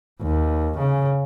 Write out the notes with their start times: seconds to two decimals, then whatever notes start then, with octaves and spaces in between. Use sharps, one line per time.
0.22 D#2
0.78 C#3